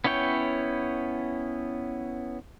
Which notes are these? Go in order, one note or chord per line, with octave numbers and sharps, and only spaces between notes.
B3 C#4 E4 C#5 G5